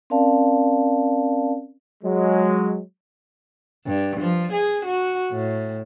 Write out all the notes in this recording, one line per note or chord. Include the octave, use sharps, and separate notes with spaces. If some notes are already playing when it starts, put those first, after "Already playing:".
C4 C#4 A#4 D5 F5 A5
F#3 G#3
G2
F3
G#4
F#4
A2